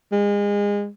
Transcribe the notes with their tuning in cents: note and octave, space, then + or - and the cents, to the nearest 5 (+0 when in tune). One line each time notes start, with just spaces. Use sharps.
G#3 -30